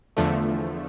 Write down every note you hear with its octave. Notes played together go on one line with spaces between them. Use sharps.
E2 D3 F3 A3